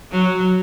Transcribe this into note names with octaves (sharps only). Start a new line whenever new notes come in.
F#3